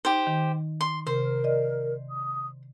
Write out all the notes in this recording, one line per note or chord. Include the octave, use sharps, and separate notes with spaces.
D#4 G4 C5
D#3
C6
C3 A#4 C5
D5 D#5
D#6